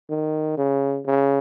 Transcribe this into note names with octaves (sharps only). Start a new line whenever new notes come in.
D#3
C#3
C#3